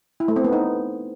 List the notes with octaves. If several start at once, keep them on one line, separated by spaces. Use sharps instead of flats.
E4
A3
C4
B3
D#4